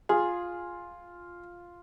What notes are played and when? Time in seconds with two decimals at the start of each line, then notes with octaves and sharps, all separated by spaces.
0.09 F4 G#4